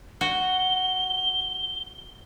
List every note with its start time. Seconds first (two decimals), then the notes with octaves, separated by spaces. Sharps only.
0.21 F#4 G7